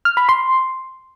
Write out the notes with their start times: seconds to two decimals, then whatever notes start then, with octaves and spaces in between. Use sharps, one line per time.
0.05 F6
0.17 B5
0.29 C6